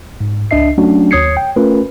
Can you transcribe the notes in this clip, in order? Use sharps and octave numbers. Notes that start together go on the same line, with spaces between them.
G#2
C#2 D4 D#5 E5 C7
F#3 A3 C#4 D4 F#4
D#2 C#5 D#6 G#6 C7 C#7
G5
A3 C#4 F4 A#4 B4